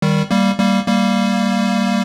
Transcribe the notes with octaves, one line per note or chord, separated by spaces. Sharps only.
D#3 G3
G3 A#3
G3 A#3
G3 A#3